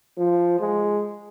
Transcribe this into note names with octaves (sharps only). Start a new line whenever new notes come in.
F3
G#3